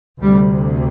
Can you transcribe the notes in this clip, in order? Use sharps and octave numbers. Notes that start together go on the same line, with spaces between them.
D2 C3 G3